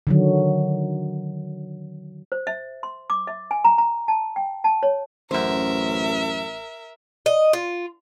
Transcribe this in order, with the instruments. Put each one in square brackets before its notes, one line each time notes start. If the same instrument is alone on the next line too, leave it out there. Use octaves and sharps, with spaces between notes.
[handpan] D3 D#3 F#3
[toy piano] C5
E5
C6
D6
E5
G#5
A#5
A#5
A5
G5
A5
C#5
[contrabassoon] A1 [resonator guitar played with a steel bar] F#2 C5 [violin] A#4 E5
[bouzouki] D#5
F4